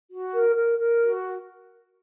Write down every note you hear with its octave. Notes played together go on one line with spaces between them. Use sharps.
F#4
A#4
A#4
A#4
F#4